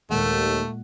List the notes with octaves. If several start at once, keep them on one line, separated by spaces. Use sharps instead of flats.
D#2 A#2 G#3 A3 F#5